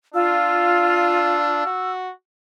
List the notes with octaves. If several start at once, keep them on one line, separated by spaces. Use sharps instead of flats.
D4 F4 E6
F#4